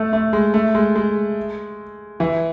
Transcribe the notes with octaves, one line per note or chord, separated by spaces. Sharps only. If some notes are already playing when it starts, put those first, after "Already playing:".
Already playing: A3
A3
G#3
A3
G#3
G#3
E3